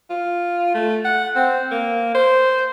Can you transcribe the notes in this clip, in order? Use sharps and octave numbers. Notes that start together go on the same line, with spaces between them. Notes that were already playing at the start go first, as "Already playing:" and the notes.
F4
A3
F#5
C4
A#3
C5